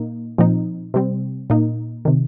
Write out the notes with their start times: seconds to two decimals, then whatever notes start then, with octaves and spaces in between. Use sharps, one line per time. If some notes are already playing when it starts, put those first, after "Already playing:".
Already playing: A#2 A#3 D#4
0.38 A#2 F3 C4 D#4
0.94 C3 G3 C4
1.50 A#2 A#3 D#4
2.05 C3 D#3